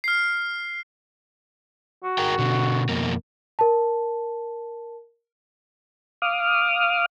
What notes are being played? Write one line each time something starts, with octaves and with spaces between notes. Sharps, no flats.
F6 C7
F#4
G#4 A#4 G5
B2 D3
F2 B2 A#3
A#4 A5
F5 D6 D#6 F6